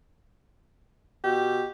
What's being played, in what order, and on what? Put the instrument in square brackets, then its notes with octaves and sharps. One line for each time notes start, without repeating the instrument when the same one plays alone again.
[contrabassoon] B2 [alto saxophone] G4